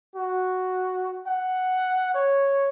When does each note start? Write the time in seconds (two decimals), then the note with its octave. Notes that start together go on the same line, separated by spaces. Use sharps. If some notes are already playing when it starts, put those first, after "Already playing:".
0.16 F#4
1.27 F#5
2.14 C#5